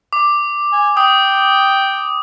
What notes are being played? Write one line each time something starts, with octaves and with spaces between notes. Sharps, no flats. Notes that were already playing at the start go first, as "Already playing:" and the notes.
D6
G#5
G5 D#6